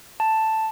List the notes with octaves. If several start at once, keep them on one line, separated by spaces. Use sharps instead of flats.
A5